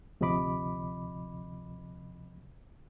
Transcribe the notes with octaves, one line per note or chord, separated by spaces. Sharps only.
D2 C3 F3 D#5 B5 D6